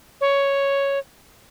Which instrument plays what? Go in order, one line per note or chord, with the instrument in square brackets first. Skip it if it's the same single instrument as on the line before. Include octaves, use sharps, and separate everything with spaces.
[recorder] C#5